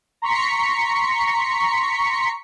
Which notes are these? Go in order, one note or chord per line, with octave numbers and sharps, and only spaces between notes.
A#5 C6 C#6 B6 C#7